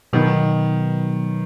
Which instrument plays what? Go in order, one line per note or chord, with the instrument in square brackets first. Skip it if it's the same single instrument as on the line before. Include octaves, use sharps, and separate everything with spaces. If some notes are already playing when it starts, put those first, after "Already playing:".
[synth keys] B2 F#3 B3 D#4 [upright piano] D#3